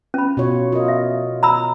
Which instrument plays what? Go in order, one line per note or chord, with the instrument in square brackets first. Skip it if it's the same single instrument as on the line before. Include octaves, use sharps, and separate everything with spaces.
[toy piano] C#4 B5
[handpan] B2 F4 C#5
F4 A#4 D#5
[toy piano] E5
A#5 B5 E6